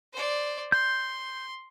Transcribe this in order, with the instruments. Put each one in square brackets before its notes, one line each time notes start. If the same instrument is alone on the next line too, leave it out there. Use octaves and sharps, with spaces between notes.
[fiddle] C5 D5
[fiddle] C6 [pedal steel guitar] G6